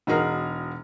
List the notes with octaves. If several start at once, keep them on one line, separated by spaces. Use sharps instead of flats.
E1 D#4 F#4 G#4 A#4 A#5